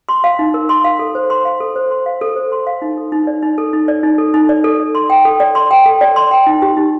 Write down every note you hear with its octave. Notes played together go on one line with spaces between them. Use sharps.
C6
F5
D#4
A#4
C6
F5
A4
C5
C6
F5
A4
C5
C6
F5
A4
C5
C6
F5
D#4
A4
D#4
D5
D#4
A4
D#4
D5
D#4
A4
D#4
D5
A4
D5
C6
G5
A4
D5
C6
G5
A4
D5
C6
G5
D#4
G4
D#4